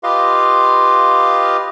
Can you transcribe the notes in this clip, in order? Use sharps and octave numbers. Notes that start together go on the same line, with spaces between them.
F4 G4 B4 D#5 F5 C6